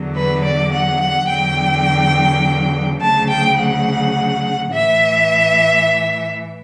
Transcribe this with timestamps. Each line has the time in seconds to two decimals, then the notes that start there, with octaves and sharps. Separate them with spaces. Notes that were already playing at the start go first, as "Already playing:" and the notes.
Already playing: E2 D3 F#3
0.16 B4
0.45 D5
0.73 F#5
1.01 F#5
1.30 E2 D3 F#3 G5
3.02 D2 C#3 F#3 A5
3.31 G5
3.59 F#5
4.73 A2 E3 E5